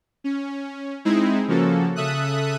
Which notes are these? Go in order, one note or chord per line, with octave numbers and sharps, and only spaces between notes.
C#4
G#3 C4 D#4 E4 G#4
C#3 F3 A#3 C#4 F#4 A4
C#3 A4 E5 D#6 F#6